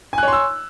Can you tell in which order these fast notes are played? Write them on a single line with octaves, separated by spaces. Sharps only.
G#5 F#6 C#5 C6 E6